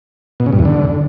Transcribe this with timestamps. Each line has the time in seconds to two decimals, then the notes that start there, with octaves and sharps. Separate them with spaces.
0.40 B2
0.46 C#3
0.53 G2
0.59 E2
0.65 D3